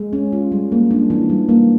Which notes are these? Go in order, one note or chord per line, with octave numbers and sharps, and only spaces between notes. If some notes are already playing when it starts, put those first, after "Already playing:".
Already playing: G#3
C#4
F4
G3
A#3
D4
E3
G3
A#3